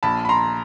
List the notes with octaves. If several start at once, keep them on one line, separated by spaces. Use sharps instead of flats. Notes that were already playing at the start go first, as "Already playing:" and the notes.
A#1 A5 B5
B5
A#5 C6